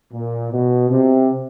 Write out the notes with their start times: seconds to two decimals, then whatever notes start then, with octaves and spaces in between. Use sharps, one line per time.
0.13 A#2
0.52 B2
0.90 C3